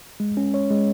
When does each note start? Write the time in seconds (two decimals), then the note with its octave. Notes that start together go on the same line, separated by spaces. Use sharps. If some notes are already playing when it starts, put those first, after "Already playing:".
0.20 G#3
0.37 C#4
0.54 C#5
0.71 G#3